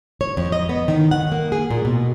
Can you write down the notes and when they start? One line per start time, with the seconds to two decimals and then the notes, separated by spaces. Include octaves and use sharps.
0.21 C#5
0.37 F2
0.52 D#5
0.69 B3
0.88 D#3
1.11 F#5
1.32 A#3
1.52 G#4
1.71 A#2
1.85 B2